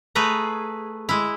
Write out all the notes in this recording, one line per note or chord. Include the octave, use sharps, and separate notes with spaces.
A3 G#4 B4 A#5
G#3 E4